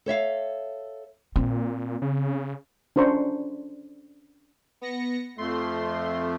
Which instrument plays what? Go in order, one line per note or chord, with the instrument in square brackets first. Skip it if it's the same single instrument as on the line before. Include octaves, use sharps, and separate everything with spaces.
[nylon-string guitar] A4 C#5 E5 F5
[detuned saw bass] A#2 [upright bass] C4
[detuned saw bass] C#3
[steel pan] C#4 D4 C5 A#5 C#6
[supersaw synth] B3 A#6 C#7
[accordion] F2 A3 [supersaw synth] C6